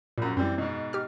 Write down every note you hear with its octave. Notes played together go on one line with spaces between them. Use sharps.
A#1 F#2 A#2
F#2 E3 G3 C4
G#2 B2
G4 F6